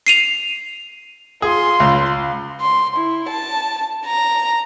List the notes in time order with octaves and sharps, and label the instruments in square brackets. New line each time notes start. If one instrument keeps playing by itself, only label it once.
[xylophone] C7 D#7 F7
[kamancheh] F4 C6 [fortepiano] G#4
[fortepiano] C#2
[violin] C6
E4
A5
A#5